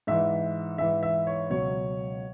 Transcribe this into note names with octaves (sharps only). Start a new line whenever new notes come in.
G#2 E3 E5
G#2 E3 E5
E5
C#5
C#2 B2 F#3 C#5